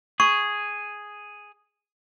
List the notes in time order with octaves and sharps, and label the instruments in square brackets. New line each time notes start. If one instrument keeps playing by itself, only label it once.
[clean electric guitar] G#4 [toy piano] C#6